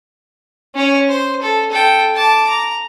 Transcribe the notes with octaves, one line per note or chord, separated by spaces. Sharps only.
C#4 C#5
C5
A4
A4 G5
A5 D6
A#5